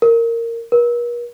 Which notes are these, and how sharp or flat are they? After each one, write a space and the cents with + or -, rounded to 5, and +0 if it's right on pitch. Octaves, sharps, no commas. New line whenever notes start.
A#4 -15
A#4 +45